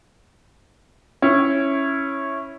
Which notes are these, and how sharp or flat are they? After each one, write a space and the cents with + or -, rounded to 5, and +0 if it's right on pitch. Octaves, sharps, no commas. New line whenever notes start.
C#4 -10 E4 +0